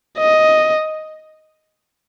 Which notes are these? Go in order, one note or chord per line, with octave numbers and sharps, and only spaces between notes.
D#5